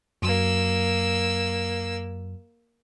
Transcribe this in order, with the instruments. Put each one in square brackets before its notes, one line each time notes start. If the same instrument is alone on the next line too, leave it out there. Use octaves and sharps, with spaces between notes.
[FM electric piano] F#2 F#3 [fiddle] A#3 E6